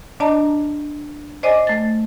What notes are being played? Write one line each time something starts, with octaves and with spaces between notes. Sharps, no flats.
D4 D5 D#5 A5 A#5
C5 D5 D#5 G#5 D6
A3 A6